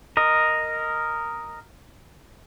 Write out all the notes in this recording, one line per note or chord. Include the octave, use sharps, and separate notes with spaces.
A#4 D#5